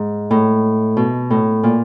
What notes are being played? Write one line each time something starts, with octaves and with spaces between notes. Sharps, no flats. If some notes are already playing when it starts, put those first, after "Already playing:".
Already playing: G#2
A2
B2
A2
A#2